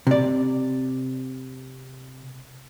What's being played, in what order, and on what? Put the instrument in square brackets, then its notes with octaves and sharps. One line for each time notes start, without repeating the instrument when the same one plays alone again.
[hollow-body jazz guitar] C3 D5